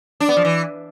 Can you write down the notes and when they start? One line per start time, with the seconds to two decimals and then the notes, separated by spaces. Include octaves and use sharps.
0.20 D4
0.29 B3
0.37 F3
0.45 E3